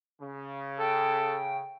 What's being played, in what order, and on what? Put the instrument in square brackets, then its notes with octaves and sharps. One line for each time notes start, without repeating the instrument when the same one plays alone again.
[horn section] C#3
[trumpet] A4 [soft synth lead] G5